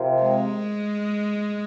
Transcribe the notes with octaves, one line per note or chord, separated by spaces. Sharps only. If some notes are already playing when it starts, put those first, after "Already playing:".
Already playing: C3 F3 C4 F4 A#4
G#3